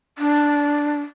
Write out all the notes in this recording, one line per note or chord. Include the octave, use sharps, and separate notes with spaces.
D4